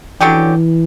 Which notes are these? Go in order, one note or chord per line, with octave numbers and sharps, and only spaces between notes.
D3 E3 F#3 C#4 G4